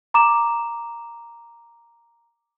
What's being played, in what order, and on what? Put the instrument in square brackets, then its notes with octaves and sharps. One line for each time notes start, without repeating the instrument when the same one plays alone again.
[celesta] A#5 D6 E7